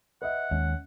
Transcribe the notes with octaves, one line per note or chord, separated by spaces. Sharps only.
B4 D#5 E5 F#5
D#2 G#3 C#4